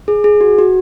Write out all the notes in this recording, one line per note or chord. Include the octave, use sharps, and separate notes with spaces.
G#4
G#4
F#4
F#4